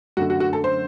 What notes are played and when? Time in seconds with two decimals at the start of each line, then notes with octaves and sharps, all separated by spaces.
0.17 F#2 D3 A3 F#4
0.30 F#4
0.40 F#4
0.53 A4
0.64 C5